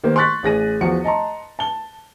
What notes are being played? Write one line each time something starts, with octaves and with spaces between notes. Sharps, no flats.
D#3 A#3 G4 C5
C6 C#6 F#6 A6 B6
A1 G#4 A#6 D#7
E2 F3 F#4 C#7
D#5 A5 A#5 C6
A5 G7